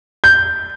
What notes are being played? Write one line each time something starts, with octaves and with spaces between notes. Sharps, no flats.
G6